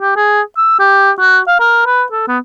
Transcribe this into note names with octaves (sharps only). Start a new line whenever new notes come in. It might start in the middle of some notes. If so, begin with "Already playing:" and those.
G4
G#4
E6
G4
F#4
F5
A#4
B4
A4
B3